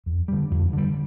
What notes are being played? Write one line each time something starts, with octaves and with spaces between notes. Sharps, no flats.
F2
D3 G3
F2
D3 G3